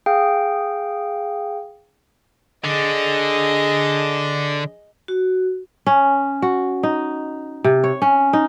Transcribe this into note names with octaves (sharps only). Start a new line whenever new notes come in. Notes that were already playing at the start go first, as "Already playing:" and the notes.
G#4 F5 G5
D3 G#4 D#5
F#4
C#4
F#4
D#4
C3
C#5
C#4
D#4